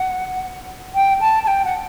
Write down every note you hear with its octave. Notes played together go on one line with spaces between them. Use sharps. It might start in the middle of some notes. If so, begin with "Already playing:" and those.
Already playing: F#5
G5
A5
A5
G5
F#5